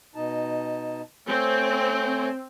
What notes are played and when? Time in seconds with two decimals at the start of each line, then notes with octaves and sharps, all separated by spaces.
0.15 B2 D#4 A5
1.28 A3 C4 C#5 G#5